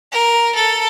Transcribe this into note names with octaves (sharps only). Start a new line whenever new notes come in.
A#4
A4